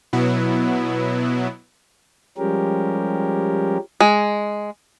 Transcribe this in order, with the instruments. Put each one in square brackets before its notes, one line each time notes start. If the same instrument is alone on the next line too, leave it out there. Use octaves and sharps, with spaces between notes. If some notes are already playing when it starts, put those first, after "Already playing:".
[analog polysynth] B2 F#3 B3 E4
[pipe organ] F3 G3 G#3 C#4 G4 A#4
[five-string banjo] G#3